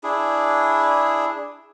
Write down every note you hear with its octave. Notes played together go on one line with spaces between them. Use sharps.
D4 E4 G#4